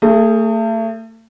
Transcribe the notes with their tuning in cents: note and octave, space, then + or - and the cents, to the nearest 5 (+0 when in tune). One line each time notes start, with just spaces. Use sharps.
A3 +35 G#4 +0